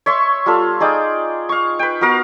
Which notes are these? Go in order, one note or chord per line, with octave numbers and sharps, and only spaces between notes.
C#5 E5 C6 C#6
G3 F4 A4
D#4 G#4 D5 G5
F5 C#6
B4 G5
B3 F#4 A#4 F5